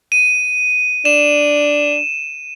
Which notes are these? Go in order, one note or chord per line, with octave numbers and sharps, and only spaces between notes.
D#7
D4 E7